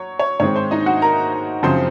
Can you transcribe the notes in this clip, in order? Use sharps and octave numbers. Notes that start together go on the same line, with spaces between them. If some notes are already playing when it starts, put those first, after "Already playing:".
Already playing: F#3 C#5
C#5
G#2 D#3 G#3 C4 C#5
C5
D#4 D#5
F#4 F#5
A#4 A#5
F#2 C#3 F3 C4 C5 C6